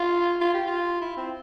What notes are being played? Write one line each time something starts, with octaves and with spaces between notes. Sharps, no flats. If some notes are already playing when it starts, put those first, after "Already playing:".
Already playing: F4
F4
G4
F4
E4
C4